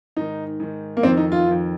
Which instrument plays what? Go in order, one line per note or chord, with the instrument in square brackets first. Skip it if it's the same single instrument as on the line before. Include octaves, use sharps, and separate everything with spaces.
[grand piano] G#2 D#3 D#4
G#2 D#3
A#3
F2 D#3 C4
D#4
F4
F2 D#3